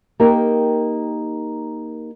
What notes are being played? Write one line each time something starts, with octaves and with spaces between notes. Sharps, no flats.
A#3 D#4 G4 A#4 G5